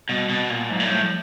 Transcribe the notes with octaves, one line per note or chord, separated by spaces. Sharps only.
B2 G3
B2
A#2
G#2 F#3
A#2
A2 G3
F3